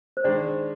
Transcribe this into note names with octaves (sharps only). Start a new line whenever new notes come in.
C5
D#3 G#3 D4 D5